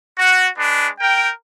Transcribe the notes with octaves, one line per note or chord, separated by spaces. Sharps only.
F#4
G#3 D4 B4
A#4 G5